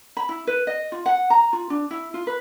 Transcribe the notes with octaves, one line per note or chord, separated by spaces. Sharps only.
B5
E4
B4
D#5
F4
F#5
A#5
F4
D4
E4
F4
B4